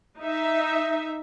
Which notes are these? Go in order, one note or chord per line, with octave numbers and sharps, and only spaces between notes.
D#4 E5